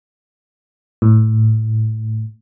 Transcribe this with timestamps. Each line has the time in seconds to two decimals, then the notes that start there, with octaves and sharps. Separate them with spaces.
1.02 A2